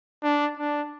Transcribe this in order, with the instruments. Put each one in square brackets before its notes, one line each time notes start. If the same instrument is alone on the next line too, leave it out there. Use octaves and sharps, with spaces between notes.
[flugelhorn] D4
D4